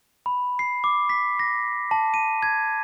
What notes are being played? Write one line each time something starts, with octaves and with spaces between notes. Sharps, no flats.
B5
C7
D6
B6
A#6
A5
D#7
G#6